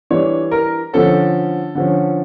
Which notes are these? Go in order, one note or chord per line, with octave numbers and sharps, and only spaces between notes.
E3 G3 D4 C#5
A#4
D3 F3 C#4 A4
D3 F3 C#4